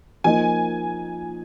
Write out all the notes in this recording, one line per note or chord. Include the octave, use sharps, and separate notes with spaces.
F3 A#3 D#4 G#5